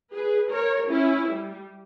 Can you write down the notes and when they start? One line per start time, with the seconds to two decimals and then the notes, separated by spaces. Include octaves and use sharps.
0.13 G#4 B4
0.51 A#4 C#5
0.89 C#4 E4
1.28 G3